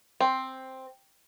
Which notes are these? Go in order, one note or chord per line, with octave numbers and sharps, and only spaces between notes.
C4